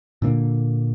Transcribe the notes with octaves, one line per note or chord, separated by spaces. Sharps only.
A#2 D3 A#3